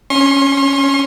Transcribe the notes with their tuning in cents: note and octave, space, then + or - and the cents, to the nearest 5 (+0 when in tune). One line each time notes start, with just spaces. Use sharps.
C#4 +0 C6 +40